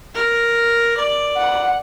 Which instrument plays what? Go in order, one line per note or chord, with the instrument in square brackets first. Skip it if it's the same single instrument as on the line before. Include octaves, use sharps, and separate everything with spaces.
[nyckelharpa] A#4
D5
[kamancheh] F#5